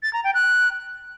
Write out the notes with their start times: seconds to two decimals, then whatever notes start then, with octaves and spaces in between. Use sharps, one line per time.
0.03 A6
0.13 A#5
0.24 G5
0.34 F#6